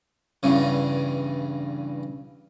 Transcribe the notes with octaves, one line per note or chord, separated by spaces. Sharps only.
E2 G2 C#3